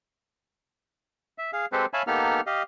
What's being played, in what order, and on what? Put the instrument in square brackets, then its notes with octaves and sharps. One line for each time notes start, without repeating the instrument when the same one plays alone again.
[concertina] E5
G#4 F5
G#3 C4 G4 A4 B4 C5
C#5 E5 F5 G#5 A5 B5
A#3 B3 D#4 G4 A4 F6
G4 D#5 F5